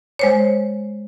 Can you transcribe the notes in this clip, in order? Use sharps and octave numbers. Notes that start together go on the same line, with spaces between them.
G#3 C5 C#5